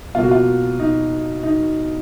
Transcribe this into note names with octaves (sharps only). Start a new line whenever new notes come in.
B2 F#3 A#3 F4
F#4
F4
D#4
D#4